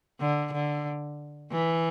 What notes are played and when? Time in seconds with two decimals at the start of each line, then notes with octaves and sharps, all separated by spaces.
0.20 D3
0.53 D3
1.51 E3